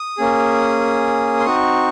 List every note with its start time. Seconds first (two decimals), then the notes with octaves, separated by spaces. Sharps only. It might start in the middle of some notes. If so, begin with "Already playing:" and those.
Already playing: D#6
0.18 A#3 C#4 G#4
1.40 C6
1.46 C4 D#4 F#4 C#6